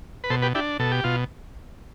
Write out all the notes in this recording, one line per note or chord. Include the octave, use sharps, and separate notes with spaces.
B4
B2 A4 C5
G4 B4
D4 E4 G4
B2 A4
G4
B2 F4